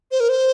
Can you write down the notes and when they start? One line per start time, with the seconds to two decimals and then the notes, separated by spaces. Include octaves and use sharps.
0.12 C5
0.20 A#4
0.29 C5